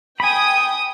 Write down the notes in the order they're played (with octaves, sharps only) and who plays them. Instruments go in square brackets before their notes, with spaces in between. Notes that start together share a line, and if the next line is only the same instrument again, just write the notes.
[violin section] G5 D#6 [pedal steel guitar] G#5 B5